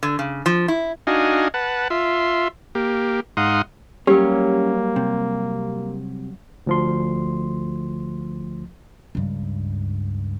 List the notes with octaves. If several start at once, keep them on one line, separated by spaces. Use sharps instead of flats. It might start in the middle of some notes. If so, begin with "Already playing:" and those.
D3
C#3
F3
E4
D4 D#4 F#4 D#5 F5 G#5
B4 F#5 A5
F4 E5 C6
A#3 G4
G#2 D#4 F5 F#5 C6 D#6
F#3 G3 A#3 C#4 G4
C3
D2 F3 C6
C#2 G2